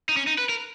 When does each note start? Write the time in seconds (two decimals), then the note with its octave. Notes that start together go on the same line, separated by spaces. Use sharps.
0.09 D#4
0.17 C#4
0.27 D#4
0.38 B4
0.49 A#4